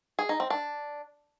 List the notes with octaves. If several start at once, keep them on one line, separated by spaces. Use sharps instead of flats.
G#4
D#4
C4
D4